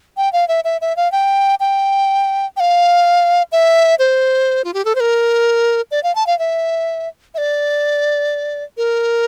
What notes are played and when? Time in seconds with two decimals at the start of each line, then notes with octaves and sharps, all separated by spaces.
0.17 G5
0.33 F5
0.48 E5
0.64 E5
0.81 E5
0.97 F5
1.12 G5
1.60 G5
2.57 G5
2.60 F5
3.52 E5
3.99 C5
4.64 F4
4.74 G4
4.85 A4
4.95 C5
5.00 A#4
5.91 D5
6.03 F5
6.15 A5
6.27 F5
6.39 E5
7.35 E5
7.38 D5
8.77 A#4